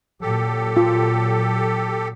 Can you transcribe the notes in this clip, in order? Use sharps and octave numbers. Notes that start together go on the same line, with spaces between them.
A#2 F#3 G4 A4
F4